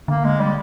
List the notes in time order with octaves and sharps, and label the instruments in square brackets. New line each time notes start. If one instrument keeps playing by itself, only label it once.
[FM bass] D3 [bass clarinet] A#3
[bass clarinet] G#3
G3